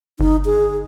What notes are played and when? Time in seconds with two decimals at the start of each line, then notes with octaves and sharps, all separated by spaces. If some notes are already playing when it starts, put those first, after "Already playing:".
0.20 G1 D#4
0.45 G#4